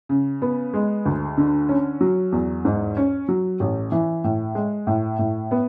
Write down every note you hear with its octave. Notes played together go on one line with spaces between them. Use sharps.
C#3
B3
G#3
D2
D3
C#4
F#3
E2
G#2
C#4
F#3
A1
E3
A2
G#3
A2
A2
B3